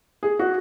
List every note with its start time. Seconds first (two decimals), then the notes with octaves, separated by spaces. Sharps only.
0.23 G#4
0.39 F#4